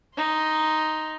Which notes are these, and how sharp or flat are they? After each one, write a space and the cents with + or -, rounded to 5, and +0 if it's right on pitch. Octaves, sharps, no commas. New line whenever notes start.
D#4 +0 C6 +0